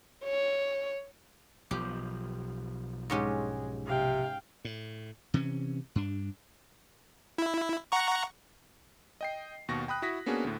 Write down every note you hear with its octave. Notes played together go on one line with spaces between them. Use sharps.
C#5
B1 F3 G4
G#2 G#3 C#4 G4
C3 F5 G5
A2
C3 E3 C#4
G2 D4
E4
F#5 A#5 C#6
D#5 G5 C7
D#2 B2 C#6 A#6
G5 B5 D#6 F#6
E4 F#4 D#6 A#6 B6
A#3 B3 C#4 D4 F#4 G#4
D2 A2